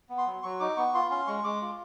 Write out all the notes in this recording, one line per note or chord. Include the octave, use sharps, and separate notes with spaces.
B3
C6
F#3
F#3 C#6
D#4 D6
B3 C#6
F4 C6
C#4 C6
G#3 C#6
G#3 D6
F4